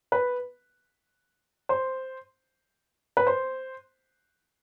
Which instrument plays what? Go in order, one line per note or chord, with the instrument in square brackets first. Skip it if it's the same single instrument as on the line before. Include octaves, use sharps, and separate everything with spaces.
[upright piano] B4
C5
B4
C5